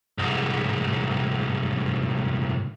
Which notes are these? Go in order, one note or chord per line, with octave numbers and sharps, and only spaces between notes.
C2 G#2